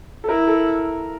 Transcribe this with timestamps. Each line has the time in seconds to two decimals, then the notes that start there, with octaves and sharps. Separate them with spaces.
0.24 A4
0.28 E4 A#4
0.48 A4